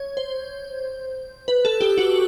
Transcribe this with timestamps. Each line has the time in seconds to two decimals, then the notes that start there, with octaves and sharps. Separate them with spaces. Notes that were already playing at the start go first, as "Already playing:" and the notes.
Already playing: C#5
0.17 C5
1.48 B4
1.65 A4
1.81 G4
1.98 F#4